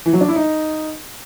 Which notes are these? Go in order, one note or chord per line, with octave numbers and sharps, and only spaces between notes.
E3
F#3
D4
E4
D#4